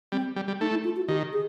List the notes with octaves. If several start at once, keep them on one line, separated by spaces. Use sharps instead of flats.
G3 C4
G3
G3
A3 D#4
E4
F4
F#4
D#3 G4
G#4